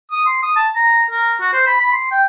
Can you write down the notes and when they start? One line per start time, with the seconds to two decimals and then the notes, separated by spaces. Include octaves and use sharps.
0.11 D#6
0.26 C6
0.43 D#6
0.56 A5
0.76 A#5
1.10 A#4
1.41 F#4
1.54 C5
1.67 B5
1.80 B5
1.92 C6
2.11 G5